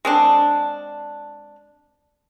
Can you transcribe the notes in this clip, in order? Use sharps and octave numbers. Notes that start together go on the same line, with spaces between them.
G#3 C4 D4